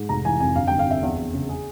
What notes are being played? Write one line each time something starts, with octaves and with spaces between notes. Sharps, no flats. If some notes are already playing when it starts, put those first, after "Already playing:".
Already playing: G#2
F1 A#5
E3 G#5
F2 G#5
G1 F5
G1 G5
F5
F2 E5
E2
E2
C#3
G#4